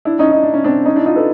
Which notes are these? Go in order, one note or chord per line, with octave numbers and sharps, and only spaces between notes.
D4 E4
C#4 D#4
D#4
D4
C#4
C4 D4
C#4 D#4
D4 E4
D#4 F4
A4 B4